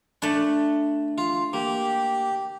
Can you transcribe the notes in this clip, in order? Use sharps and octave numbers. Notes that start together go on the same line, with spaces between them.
A3 D4 B5
F4
A#3 G4